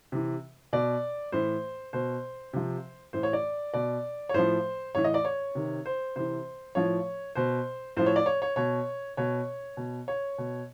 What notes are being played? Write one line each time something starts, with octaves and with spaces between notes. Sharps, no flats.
C3 E3
B2 D5
A2 E3 C5
B2 C5
C3 F3
A2 E3 C5
C#5
D5
B2 D5
C#5
A2 F3 C5
A2 E3 C#5
D#5
D5
C#5
C3 D#3
C5
C3 E3 C5
A2 F3 C#5
B2 C5
A2 F3 C5
C#5
D5
C#5
C#5
B2 C#5
B2 C#5
B2
C#5
B2